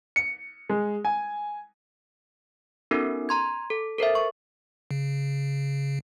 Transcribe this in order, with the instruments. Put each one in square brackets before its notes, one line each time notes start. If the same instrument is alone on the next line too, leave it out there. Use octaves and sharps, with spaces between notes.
[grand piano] C#7
G#3
G#5
[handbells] B3 C#4 D#4 F#4 A4 A#4
A#5 C6 G#6
A4
A4 A#4 C5 E5
C#6
[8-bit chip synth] C#3